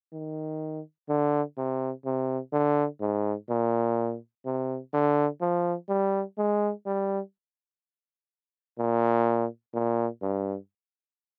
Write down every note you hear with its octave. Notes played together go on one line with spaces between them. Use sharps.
D#3
D3
C3
C3
D3
G#2
A#2
C3
D3
F3
G3
G#3
G3
A#2
A#2
G2